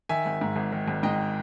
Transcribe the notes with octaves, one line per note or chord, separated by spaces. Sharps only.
D#3 E5 G#5
G#1
G#2
G#1
D#3
G#1
G#2 D#5 G5